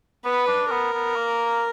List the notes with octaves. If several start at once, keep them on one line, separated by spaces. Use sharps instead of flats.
B3 B4
D4
B3 A#4
B3
A#3